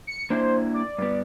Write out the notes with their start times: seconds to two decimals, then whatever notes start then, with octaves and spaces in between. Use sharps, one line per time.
0.07 C#7
0.30 A#3 D4 E4 C5
0.73 D5
0.98 G2 B3